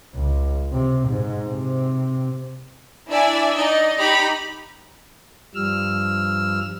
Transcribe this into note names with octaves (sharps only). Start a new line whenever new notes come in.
C#2
C3
G#2
C3
D4 E4 D5 E5 G#5 E6
D#4 D5 D#5
D#4 G4 A#5 B5
G2 F3 G3 E6 F6